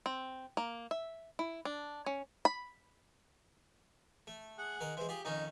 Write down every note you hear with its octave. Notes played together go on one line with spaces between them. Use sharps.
C4
A#3
E5
E4
D4
C#4
B5
A3
G#4 F#5
D#3 A#4
E3 G#3 C5
F4 G4 G#4
F2 D#3 C#4 D#4